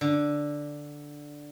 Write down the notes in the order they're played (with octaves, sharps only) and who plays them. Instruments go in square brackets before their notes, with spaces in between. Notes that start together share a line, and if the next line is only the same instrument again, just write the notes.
[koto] D3